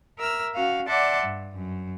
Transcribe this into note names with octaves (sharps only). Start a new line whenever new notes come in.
A#4 E5 E6 F6
C#4 F#4 F5
D5 E5 F#5 A5 C6 D6
G2
F#2